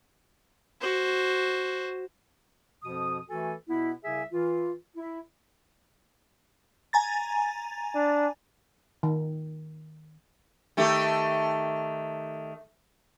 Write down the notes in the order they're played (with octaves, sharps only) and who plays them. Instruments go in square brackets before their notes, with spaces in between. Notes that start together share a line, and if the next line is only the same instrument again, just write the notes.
[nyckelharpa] F#4 C5
[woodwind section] F2 B2 F3 D#6
E3 A3 F#4 A4 G#5
B2 B3 E4
C2 C#3 G#4 E5 G#5
E3 F4
E4
[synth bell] G#5 A#5 A6
[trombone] D4
[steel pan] D#3
[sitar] D#3 A3 G4